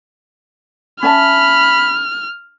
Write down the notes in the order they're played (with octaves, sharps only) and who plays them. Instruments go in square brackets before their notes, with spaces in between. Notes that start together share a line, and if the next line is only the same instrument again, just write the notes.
[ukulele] C#4 E5 A5 [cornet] B5 [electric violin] F6